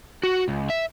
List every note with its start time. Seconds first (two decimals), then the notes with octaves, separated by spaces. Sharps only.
0.23 F#4
0.48 C#2
0.70 E5